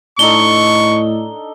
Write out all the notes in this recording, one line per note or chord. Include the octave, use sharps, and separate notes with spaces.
A2 D4 D#4 A4 C#6 G7